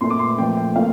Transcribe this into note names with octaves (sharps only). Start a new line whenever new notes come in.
A#2 A3 C6
D6
C6
A#2 F3 A3 G5
G5
A#2 A3 F5